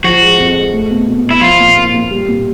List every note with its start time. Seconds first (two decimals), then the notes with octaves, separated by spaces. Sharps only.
0.04 F3 F#4
0.21 G#3
0.38 F2
0.55 G#3
0.73 A3
0.90 B2
1.08 B2
1.25 B2
1.31 E4
1.41 F3 F4
1.60 A#2
1.77 A#3
1.94 A#3
2.11 G3
2.28 A#2